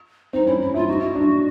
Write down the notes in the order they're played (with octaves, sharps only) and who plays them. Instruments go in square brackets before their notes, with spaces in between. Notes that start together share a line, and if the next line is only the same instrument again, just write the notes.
[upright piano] C4 [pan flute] D#4
[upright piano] C#4 [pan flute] E4
[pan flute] E4
[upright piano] E4 [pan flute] F4
[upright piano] D#4 [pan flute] F#4
[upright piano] D4